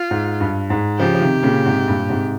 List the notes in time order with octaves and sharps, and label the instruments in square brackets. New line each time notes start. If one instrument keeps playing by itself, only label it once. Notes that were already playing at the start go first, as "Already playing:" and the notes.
Already playing: [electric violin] F4
[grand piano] G#2
G2
G#2
[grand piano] C#3 F3 [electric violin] G4
[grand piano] F3
C3 D#3
A#2 C#3
G#2 C3
G2 A#2
G#2 C3